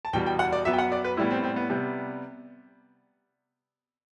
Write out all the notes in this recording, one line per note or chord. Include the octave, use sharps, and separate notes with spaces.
A5
E2 B2 G3 G5
G5
F#5
D5
F#2 F#3 B3 E5
G5
F#5
D5
B4
A2 G3 B3 E4
C4
C4
B3
C3 G3 B3